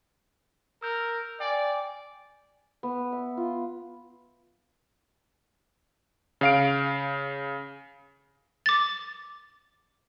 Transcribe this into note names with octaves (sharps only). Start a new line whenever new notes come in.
A#4 E6 G6
D5 G5 G#5
B3
E5
F4
C#3 F5 D7
D6 A6